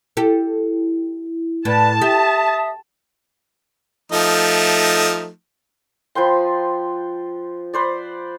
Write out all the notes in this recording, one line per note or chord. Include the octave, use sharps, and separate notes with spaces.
E4 G4 A4
A2 B4 D5 A5
G4 E5 D#6
F3 A3 D#4
F3 B4 G5 C6
B4 C5 D5